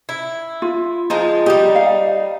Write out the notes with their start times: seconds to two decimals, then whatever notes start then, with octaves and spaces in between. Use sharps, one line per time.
0.09 E4
0.62 F4
1.10 F3 G#3 D#4 F4
1.46 G3 D#4 G4
1.75 F5